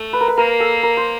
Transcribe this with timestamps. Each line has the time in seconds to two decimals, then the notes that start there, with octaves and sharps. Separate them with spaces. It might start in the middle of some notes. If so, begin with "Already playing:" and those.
Already playing: A3
0.13 B4
0.21 A#4
0.28 B4
0.37 A#3 A#4
0.60 A4
0.83 A#4
0.97 C5